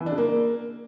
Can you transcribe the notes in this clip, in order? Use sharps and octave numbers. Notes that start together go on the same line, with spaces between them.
E3
D4
C#3
A#3